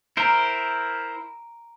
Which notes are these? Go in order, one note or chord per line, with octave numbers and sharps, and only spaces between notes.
E4 A#4 C5 A#5 D7